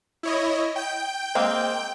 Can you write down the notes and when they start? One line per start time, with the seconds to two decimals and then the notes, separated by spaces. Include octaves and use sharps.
0.23 E4 C#5 D#5
0.76 G5 G6
1.35 G#3 A#3 C4